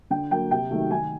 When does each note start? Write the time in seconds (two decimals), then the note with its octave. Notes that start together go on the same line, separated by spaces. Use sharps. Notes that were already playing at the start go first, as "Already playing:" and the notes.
0.10 D3 G5
0.31 F#3 A#3 G5
0.51 C3 G5
0.71 D#3 F#3 A3
0.91 D#3 G#5